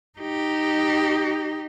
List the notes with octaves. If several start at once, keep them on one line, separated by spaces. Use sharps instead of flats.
D#4 G4